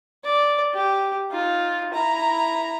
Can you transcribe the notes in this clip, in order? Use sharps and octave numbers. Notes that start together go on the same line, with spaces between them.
D5
G4
D#4 F4
E4 A#5